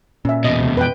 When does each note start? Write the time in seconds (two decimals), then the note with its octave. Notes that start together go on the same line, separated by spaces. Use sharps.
0.25 A#2 C#4 E5
0.44 E2 B2 D#5
0.60 D2 C3 A3
0.77 F2 B4 G5